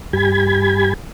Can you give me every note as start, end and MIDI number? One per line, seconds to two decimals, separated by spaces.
0.13 0.93 43
0.13 0.93 67
0.13 0.93 80
0.13 0.93 83
0.13 0.93 92